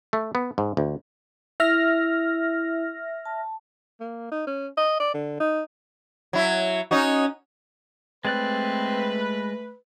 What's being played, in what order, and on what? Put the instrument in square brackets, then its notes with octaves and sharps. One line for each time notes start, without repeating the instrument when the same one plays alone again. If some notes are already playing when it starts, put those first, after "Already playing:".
[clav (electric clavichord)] A3
B3
G#2
D2
[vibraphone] E4 [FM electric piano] E5 F6 A#6
[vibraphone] A5
[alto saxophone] A#3
D#4
C#4
D#5
D5
D3
D#4
[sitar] F#3 E4
C#4 D#4 F#4
[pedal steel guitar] G#3 D5 F#6 [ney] A3 [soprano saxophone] C4 [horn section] B4